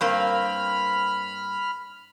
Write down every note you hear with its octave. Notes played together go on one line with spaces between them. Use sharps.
G2 A#3 C4 B5 F6